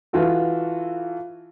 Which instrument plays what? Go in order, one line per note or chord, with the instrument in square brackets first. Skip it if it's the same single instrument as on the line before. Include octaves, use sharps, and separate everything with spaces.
[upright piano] E3 F4 F#4 A4